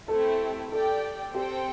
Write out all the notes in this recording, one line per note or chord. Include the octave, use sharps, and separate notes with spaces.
A3 C4 E4 G4 A4
G4 A4 D5 G5
C4 G4 A4 C5 G5